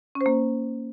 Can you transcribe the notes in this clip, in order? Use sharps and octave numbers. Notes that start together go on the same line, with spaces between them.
C#4
C5
A#3